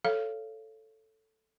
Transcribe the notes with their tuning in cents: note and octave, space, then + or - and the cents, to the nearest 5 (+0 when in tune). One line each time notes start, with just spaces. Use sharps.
A4 +0 C#5 +0 F5 -20